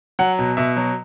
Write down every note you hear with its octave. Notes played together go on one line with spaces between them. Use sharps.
F#3 F#5
B2
B2 E5
F#3